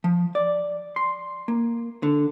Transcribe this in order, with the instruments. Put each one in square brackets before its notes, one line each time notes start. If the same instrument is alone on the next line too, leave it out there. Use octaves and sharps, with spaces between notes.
[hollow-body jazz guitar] F3
D5
C6
A#3
D3